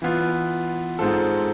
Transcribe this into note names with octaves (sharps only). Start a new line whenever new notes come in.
E3 B3 F4
G#2 G#3 C4 F4 A4